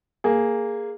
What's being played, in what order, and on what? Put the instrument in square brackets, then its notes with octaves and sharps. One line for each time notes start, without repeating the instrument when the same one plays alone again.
[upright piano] A#3 G#4